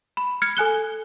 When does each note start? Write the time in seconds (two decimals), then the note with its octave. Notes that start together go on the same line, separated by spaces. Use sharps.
0.17 B5
0.42 F6 G#6 C#7
0.57 A4 G#5 F#6 G7